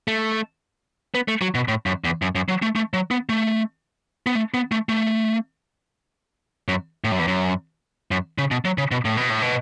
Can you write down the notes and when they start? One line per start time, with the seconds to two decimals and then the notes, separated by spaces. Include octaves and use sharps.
0.08 A3
1.14 B3
1.28 A3
1.42 F#3
1.55 B2
1.68 A2
1.86 F#2
2.04 E2
2.22 F#2
2.35 F#2
2.49 F#3
2.62 A3
2.76 A3
2.94 F#3
3.11 B3
3.29 A3
4.26 B3
4.36 A3
4.54 B3
4.72 A3
4.89 A3
6.68 F#2
7.04 A2
7.11 F#2
7.19 E2
7.28 F#2
8.11 F#2
8.38 C#3
8.51 B2
8.65 F#3
8.78 C#3
8.91 B2
9.05 A2
9.17 B2
9.30 A2
9.42 B2